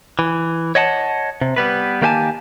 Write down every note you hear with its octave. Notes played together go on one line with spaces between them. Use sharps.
E3
C#5 D#5 F#5 G#5 A5
C3
G3 B3 B4
D#3 A#3 G4 B4 G#5 A5